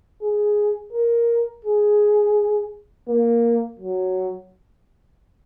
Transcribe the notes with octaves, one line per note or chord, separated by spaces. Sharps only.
G#4
A#4
G#4
A#3
F#3